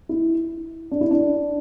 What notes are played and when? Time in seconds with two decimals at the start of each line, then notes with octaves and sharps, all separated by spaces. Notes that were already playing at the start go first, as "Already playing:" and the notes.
0.09 E4
0.91 D4
1.01 E4
1.11 D4